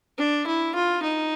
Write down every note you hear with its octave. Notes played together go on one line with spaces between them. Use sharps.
D4
E4
F4
D#4